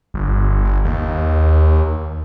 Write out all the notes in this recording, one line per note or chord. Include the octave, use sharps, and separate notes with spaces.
G1
G1
D#2